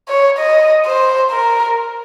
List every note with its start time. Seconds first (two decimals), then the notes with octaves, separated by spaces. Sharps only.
0.08 C#5
0.38 D#5
0.86 C5
1.31 A#4